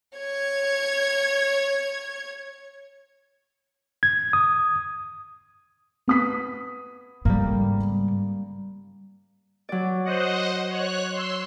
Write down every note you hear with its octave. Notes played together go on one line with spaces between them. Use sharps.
C#5 G#6
G#6
D#6
B3 D#6 B6
G#2 C#3 G3 A#3
F#3 D5
C5 D#5 F#5
C#5 F#6
C6 E6